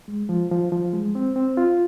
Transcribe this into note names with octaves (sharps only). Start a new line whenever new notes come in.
G#3
F3
F3
F3
G#3
C4
C4
F4